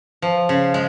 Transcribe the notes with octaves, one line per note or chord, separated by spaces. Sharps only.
F3
C#3
G#3